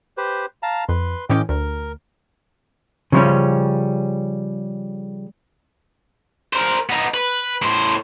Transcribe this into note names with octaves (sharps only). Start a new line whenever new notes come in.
G4 B4 C5
F5 A5 A#5
F2 B4 C6
A2 E3 C#4 D#5 G5 D6
D2 A#4
C#3 F3 G3 C#4
A#4 C5
B3 D#4
B4
A2 C5